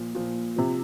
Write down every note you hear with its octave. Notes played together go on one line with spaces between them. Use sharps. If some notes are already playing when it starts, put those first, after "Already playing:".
Already playing: A#2 F3
A#2 F3
C3 F3